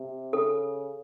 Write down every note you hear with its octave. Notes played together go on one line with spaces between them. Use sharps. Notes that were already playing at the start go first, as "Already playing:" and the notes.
Already playing: C3
C#3 A4